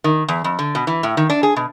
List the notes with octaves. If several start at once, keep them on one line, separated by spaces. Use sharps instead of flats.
D#3
E2
F2
D3
B2
E3
A2
D#3
D4
G#4
B2